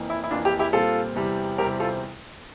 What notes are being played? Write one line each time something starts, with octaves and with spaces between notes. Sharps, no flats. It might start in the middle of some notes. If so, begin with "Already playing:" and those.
Already playing: F2 E3 A#3
E4
E4
F2 E3 A#3 D4 F4
E4 G4
E4 G4
A#2 G3 C4 F4 A4
E2 C3 G3
E2 C3 G3 C4 G4 A#4
F4 A4